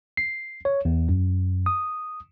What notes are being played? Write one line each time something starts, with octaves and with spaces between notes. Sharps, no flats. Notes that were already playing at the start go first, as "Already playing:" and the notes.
C7
C#5
E2
F#2
D#6